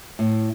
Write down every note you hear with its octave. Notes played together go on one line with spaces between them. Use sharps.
A2